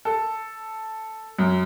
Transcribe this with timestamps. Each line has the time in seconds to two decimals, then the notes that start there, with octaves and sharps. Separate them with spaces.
0.05 A4
1.39 F#2